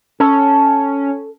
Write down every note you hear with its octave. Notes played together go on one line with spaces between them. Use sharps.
C#4 A4